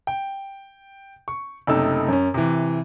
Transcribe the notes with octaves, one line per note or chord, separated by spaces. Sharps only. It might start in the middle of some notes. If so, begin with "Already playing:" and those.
G5
C#6
F#1 C3 A3 D#4 E6
F#2 C#4
C3 E3